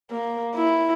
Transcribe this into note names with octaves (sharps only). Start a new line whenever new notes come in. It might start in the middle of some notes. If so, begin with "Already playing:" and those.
A#3
E4